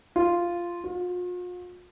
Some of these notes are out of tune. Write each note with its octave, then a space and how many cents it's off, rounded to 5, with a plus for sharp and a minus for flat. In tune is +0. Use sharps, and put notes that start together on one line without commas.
F4 -5
F4 +45